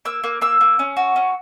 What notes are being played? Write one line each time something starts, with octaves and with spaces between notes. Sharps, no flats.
A#3 E6
A#3
A#3 E6
A#3
C#4
F#4
C#4